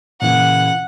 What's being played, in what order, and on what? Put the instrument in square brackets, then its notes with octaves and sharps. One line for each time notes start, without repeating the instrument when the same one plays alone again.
[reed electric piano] A#2 [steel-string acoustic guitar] C#3 E3 A#3 [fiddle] F#5